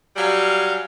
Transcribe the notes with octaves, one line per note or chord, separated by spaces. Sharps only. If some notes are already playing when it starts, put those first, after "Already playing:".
F#3 G3 F5 G#5